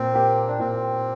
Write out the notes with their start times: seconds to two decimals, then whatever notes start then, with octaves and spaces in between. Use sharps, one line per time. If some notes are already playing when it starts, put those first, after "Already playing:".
Already playing: A#2 C4
0.13 A#3 G4
0.48 D4
0.59 A#2 C4